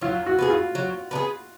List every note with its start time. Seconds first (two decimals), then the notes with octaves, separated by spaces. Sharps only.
0.01 F#3 F4
0.26 F#4
0.39 B3 D4 G#4
0.50 F4
0.75 F#3
1.11 B3 D4
1.15 G#4